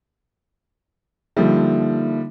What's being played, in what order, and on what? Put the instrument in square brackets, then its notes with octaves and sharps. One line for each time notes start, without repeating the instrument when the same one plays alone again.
[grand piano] D3 F3 G3 [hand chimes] A#3 D#4 E5